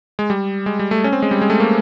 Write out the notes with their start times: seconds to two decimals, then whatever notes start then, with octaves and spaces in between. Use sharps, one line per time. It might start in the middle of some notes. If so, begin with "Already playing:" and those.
0.19 G#3
0.30 G3
0.66 G#3
0.79 G3
0.91 A3
1.04 C#4
1.13 C4
1.22 G#3
1.31 G3
1.42 G#3
1.50 A3
1.60 A#3